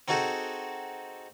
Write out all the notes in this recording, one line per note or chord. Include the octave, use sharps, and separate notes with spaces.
C4 D#4 F#4 G#4 A4 C5